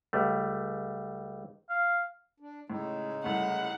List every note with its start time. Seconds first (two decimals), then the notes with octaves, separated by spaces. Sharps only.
0.13 C#2 G3 A3
1.69 F5
2.40 D4
2.70 A2 C#3 G#3 D#4
3.24 C2 A3 F#5